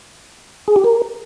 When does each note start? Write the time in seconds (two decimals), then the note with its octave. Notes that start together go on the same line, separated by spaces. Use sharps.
0.68 G#4
0.76 G4
0.84 A#4